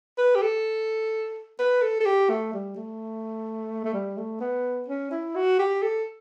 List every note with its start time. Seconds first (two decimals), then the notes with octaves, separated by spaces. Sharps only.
0.18 B4
0.35 G4
0.42 A4
1.59 B4
1.82 A4
2.00 A4
2.06 G4
2.30 A3
2.54 G3
2.77 A3
3.85 A3
3.94 G3
4.18 A3
4.41 B3
4.88 C#4
5.11 E4
5.36 F#4
5.59 G4
5.83 A4